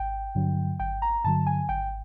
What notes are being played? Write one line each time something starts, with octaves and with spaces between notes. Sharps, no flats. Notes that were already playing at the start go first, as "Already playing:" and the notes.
Already playing: G#1 G5
G2 D3 F#3
G#1 G5
A#5
G2 D3 F#3 A5
G#5
G#1 G5